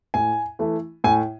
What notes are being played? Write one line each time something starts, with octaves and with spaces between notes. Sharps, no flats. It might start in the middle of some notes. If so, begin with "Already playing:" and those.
A2 G#5
E3 A3
A2 G#5